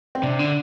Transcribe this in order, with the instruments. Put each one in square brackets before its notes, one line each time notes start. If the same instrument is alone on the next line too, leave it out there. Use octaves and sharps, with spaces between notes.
[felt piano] C4
[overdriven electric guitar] C3 [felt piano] D4
[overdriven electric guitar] D3